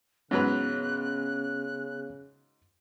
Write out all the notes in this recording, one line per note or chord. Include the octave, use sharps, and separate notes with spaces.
G#2 C#3 F#3 B3 C#4 B4 F#6